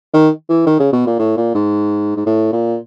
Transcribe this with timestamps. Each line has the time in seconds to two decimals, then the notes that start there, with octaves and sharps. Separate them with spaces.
0.14 D#3
0.49 E3
0.66 D#3
0.80 C#3
0.93 B2
1.07 A#2
1.19 A2
1.37 A#2
1.55 G#2
2.17 G#2
2.26 A2
2.53 A#2